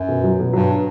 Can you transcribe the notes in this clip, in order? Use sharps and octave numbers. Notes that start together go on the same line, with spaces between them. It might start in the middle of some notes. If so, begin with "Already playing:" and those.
Already playing: F#2
B2
F#3
B2
G2 F#3